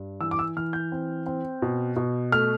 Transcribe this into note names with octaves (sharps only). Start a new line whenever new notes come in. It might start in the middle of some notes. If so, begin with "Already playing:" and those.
Already playing: G2
E3 E6
D6
E6
E3 F6
G6
C4
C4
B2
B2
A3 F6